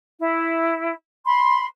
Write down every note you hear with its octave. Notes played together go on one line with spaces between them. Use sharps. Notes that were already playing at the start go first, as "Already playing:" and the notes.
E4
B5 C6